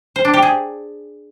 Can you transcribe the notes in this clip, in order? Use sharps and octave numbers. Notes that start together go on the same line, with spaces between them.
C5
D4
G4
G#4